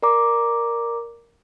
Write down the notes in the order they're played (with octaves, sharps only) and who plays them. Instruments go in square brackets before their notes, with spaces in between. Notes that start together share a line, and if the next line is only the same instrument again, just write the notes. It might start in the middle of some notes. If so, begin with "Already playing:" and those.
[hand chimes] A#4 D5 A#5 D6